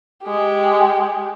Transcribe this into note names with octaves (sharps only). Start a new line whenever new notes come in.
G#3 G4